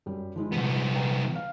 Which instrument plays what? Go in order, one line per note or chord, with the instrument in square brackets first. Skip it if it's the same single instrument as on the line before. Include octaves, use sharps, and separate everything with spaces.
[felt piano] F#2 G3
F3 G#3 E4
[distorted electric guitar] C2 B3
[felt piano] B4 G5 A#5
F5